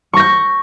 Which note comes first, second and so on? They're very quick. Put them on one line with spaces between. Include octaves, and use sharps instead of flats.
C#6 A#6 G6